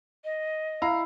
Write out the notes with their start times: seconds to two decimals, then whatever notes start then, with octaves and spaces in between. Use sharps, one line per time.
0.25 D#5
0.82 E4 F5 A#5